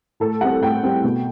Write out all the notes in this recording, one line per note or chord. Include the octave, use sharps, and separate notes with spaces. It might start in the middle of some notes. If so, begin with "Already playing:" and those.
A2 A4
G3 C4 F#5
A2 G5
G3 C4
B2